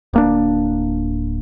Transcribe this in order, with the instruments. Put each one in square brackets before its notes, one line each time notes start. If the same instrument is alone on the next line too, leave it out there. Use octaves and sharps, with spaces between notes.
[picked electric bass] D1 A#3 D4